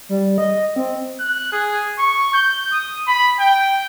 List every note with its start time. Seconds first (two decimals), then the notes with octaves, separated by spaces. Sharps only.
0.09 G3
0.38 D#5
0.76 C4
1.19 F#6
1.52 G#4
1.99 C#6
2.34 G6
2.72 D#6
3.08 B5
3.40 G5